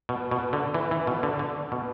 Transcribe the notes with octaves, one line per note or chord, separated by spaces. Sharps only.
B2
B2
D3
E3
E3
B2
D3
D3
B2